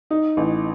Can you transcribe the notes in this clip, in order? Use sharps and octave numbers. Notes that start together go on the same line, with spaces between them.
D#4
A1